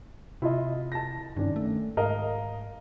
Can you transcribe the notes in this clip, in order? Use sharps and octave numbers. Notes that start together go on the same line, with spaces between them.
C3 E4 F4 D#5
A5 A#6
G2 D#3 C#4 D4
A3
G#2 A#4 D#5 F5